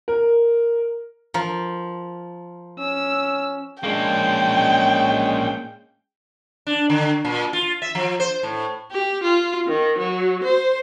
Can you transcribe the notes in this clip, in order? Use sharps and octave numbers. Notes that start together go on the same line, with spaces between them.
A#4
F3 A#4
C#4 E6
G#3 A#3 C#4 D4 G5
D4
D3
A#2
F4
E5
F3
C5
A2
G4
F4
D#3
F#3
C5